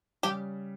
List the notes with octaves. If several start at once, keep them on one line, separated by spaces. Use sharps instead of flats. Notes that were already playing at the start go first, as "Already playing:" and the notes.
C#3 G3 G4